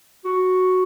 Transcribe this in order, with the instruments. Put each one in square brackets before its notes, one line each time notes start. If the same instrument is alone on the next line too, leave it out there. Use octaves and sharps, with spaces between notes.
[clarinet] F#4